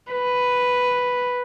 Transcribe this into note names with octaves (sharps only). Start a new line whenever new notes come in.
B4